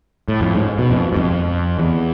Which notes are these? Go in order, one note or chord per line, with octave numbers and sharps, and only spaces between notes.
A2
F2
G#2
B2
F2
G#2
F2
E2